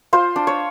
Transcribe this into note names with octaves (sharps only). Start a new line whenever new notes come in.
F4 C5
D4
C#5